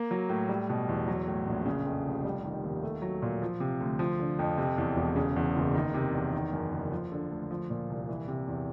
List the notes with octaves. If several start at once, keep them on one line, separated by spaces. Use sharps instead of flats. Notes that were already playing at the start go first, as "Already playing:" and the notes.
Already playing: A#3
F#3
A2
G3
B2
E2
F#3
A2
A#1
C#3
F2
F1
G3
D#3
D#2
A3
F#3
A#2
F3
C3
D2
F3
D3
F2
C3
E2
E1
C#3
E2
F#1
D#3
C3
E2
D#3
F#2
F#1
F3
D3
D2
F3
A#2
C2
E3
C3
E2